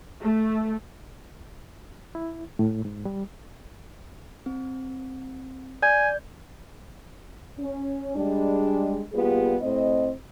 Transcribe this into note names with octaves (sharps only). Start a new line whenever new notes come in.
A3
E4
A2
G#2
G3
C4
D5 G#5 G6 G#6
C#4
G3 G#3 D4
G3 A#3 B3 F4 G4 G#4
A2 C4 D#5